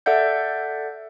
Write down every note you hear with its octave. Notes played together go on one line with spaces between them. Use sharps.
A4 D5 E5 F#5 G6